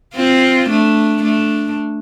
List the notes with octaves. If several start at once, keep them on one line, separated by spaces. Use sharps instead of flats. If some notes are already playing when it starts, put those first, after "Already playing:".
C4 F4
A3 D4
A3 D4